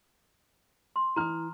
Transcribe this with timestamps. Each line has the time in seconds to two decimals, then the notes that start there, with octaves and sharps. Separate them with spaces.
0.96 C6
1.16 E3 A#5 D#6 F6